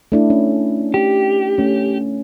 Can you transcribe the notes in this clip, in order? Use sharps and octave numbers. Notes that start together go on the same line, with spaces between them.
A3 D4 E4
C#4
G4
A3 C#4